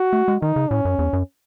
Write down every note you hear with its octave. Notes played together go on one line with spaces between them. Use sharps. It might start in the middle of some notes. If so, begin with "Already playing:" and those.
Already playing: F#4
A3
G#3
D#3 D#4
C#3
A2 C#4
F#2
E2
F#2